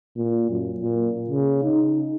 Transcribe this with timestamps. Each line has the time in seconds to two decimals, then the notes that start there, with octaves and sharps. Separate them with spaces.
0.17 A#2
0.50 F#2
0.80 A#2
1.30 C#3
1.63 D#4